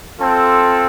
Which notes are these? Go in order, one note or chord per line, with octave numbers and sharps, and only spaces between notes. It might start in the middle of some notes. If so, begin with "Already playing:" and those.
C4 F4 A4